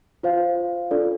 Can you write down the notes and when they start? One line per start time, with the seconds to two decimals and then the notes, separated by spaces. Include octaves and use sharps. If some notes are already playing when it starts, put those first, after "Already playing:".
0.23 F4 C5 F5
0.91 D4 F4 A4 D5